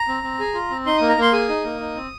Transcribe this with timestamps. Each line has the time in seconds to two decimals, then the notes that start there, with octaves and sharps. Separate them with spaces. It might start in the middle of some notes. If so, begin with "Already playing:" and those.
Already playing: A#5
0.08 C4
0.23 C4
0.40 G#4
0.54 F4
0.70 C4
0.86 D#4 C6
0.97 A#3 D#6
1.09 A#5
1.17 A#3 C6
1.33 G#4 D#6
1.49 D#4
1.65 A#3
1.80 D#4
1.96 C4